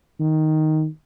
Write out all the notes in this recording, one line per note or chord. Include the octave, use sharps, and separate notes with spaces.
D#3